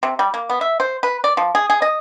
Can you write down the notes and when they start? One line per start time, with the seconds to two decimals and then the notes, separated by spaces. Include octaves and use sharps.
0.03 C3
0.19 G3
0.34 A#3
0.50 B3
0.61 E5
0.80 C5
1.03 B4
1.24 D5
1.37 F3
1.55 G#4
1.70 G#4
1.82 D#5